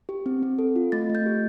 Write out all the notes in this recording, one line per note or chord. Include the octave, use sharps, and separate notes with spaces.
G4
C4
C4
A4
F4
A3 A6
A3
G6
G4